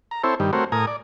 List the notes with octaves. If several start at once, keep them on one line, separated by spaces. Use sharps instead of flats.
A#5
C4 E4 A4 C5 C#5
G2 D#3 G3
A3 C4 F#4 A#4 C5 C#5
A2 A#4 G#5 A#5 D#6
D5